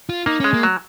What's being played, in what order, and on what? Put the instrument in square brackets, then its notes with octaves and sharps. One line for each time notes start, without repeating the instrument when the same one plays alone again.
[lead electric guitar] F4
[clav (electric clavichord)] A#3 [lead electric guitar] D#4
[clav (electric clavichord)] G#3 [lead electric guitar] C#4
[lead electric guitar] A#3
[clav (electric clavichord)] F#3